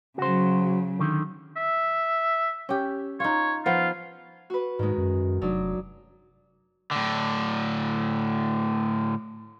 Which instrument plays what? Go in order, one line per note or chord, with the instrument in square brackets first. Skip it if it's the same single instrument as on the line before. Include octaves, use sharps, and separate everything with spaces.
[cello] C#3 F#3 [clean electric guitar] F#4 C5
[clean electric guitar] D3 D#3
[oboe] E5
[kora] C#4 G4
[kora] D#4 F4 [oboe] C#5
[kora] F3 B3 F#5 [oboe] F4
[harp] F#4 B4
[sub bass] G#2 [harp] D#3 G#3
[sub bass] F#2
[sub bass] F1 [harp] F#3 D4 D#4
[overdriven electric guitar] A2 D3